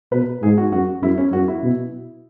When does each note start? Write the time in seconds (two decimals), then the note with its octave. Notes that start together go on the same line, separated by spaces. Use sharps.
0.12 B2 B4
0.43 G#2 G#4
0.58 F#4
0.72 F#2 F#4
1.03 F#2 E4
1.18 C#4
1.32 F#2 F#4
1.48 E4
1.63 B2